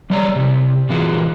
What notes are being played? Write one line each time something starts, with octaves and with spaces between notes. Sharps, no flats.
G3 G#3 C#5 D5 F#5 A#5
C3 E4
A#2 D3 E3 G#3 F4 F#4